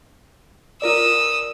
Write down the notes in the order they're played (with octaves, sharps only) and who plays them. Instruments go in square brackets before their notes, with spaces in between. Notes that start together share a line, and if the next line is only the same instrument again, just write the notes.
[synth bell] F4 A#4 D5 [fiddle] D#6 E6